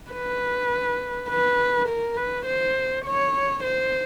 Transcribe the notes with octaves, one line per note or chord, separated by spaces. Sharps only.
B4
B4
A#4
B4
C5
C#5
C5